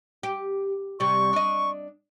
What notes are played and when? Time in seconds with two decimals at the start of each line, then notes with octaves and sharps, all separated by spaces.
0.23 G4
1.00 C3 G3 C#6
1.33 D4 D#5